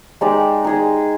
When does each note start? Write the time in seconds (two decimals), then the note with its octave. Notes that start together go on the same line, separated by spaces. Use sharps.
0.21 G#3 D#4 G4 D5
0.64 D#4 G#4 D#5